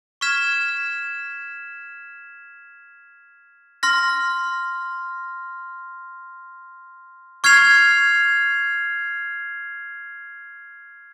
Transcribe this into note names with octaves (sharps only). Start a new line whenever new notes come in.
C#6 F6 G#6 B6 E7
C6 F6 A#6
C#6 F6 G#6 C7 F7